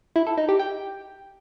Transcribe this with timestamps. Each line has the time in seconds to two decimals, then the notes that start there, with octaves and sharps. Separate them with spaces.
0.16 E4
0.27 A4
0.38 D#4
0.49 G4
0.59 G5